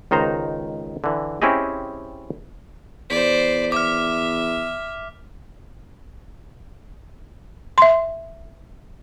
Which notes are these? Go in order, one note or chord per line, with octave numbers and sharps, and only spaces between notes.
C#2 D#3 D#4 C5 A#5
D3 E3
C4 C#4 E4 G4 G#4 D#5
E2 C5 D5 B6
E5 D6 F6
E5 C6